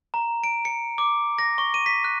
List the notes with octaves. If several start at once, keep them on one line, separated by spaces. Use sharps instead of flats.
A#5
D7
C#7
D6
A#6
C#6
D#7
B6
F#6